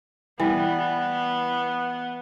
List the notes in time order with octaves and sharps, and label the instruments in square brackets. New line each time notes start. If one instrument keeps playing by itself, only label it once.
[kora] E3 G3 [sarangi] B3